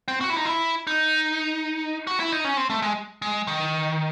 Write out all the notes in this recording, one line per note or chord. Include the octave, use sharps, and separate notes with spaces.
C4
F#4
E4
D#4
E4
D#4
F#4
E4
D#4
C#4
C4
A3
G#3
G#3
D#3